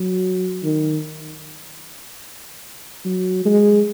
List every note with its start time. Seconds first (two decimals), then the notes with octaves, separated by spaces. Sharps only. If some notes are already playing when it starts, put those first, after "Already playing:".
Already playing: F#3
0.63 D#3
3.05 F#3
3.45 G#3